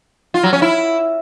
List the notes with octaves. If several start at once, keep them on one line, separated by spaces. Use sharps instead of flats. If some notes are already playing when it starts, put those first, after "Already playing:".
F4
F#3
C#4
E4